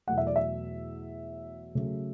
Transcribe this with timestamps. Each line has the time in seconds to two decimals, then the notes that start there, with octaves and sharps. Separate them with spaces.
0.07 E2 B2 F#3 A3 F#5
0.18 E5
0.27 D5
0.36 E5
1.75 C#3 F#3 A3